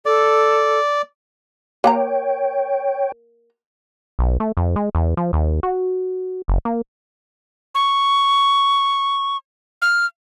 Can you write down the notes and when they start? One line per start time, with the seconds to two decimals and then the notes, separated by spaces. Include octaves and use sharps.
0.06 A4 D5
1.84 A#3 C#5 F#5 G5 A#5
4.19 B1
4.40 A3
4.57 F2
4.76 G#3
4.95 E2
5.17 F3
5.33 D#2
5.63 F#4
6.48 F#1
6.65 A#3
7.75 C#6
9.82 F6